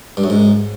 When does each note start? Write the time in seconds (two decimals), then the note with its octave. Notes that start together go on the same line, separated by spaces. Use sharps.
0.17 G2
0.24 F#2
0.30 G#2